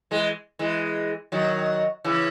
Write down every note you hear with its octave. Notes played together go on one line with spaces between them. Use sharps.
E3 G#3
E3 G#3
D#3 F#3
C#3 E3